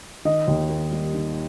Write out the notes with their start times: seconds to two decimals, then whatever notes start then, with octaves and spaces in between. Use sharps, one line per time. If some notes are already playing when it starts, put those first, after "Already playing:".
0.25 D#3 D#5
0.47 D#2
0.70 A#3
0.92 G3
1.14 D#3